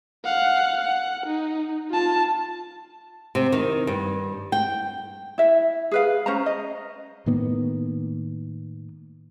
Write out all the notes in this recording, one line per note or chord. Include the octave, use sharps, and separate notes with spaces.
F5 F#5
F#5
D#4
F4 A5
C3
D#3
G2
G5
E4 E5
G#4 B4 F5
C#4 C5 A#5
D#5
A2 D#3 A#3 B3